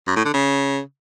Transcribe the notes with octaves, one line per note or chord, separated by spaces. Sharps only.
F#2
A2
D3
C#3